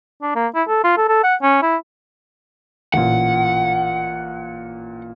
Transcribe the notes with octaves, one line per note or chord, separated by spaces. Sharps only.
D4
A#3
E4
A4
F4
A4
A4
F#5
C#4
E4
A1 A#2 F#5